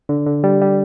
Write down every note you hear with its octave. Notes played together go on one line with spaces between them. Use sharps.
D3
D3
G3
G3